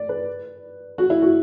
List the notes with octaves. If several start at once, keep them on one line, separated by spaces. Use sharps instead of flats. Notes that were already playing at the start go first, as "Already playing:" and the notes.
Already playing: D5
B4
F#4
E4
F#4